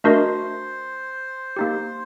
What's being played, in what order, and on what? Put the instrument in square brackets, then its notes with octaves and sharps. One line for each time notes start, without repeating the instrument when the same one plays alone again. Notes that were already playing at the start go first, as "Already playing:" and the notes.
[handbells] A3 D4 F#4 A#4 D#5 [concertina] C5
[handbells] A#3 D#4 G4